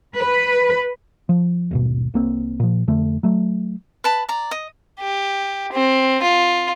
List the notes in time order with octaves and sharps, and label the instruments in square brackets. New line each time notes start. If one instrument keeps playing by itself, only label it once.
[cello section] B4
[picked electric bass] F3
D#1 G#1 B2
C2 A#3 C4
A#2 F3
F2 D3 A3
F#3 A3
[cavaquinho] B4 A5 B5
D5 A#5
D#5
[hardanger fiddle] G4
C4
F4